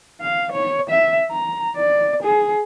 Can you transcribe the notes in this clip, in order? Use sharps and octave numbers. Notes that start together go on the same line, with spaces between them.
F5
C#5
E5
A#5
D5
G#4